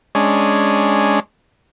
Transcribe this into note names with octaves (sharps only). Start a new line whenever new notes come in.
G#3 C#4 D4